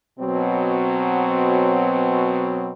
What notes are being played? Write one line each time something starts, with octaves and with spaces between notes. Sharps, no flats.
B2 F#3 C4